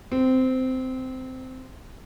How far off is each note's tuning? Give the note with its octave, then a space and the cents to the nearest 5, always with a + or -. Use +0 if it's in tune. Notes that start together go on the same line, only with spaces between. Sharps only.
C4 -15